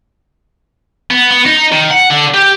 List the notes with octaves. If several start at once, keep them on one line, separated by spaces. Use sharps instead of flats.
B3
B3
D#4
D#3
F#5
D3
G4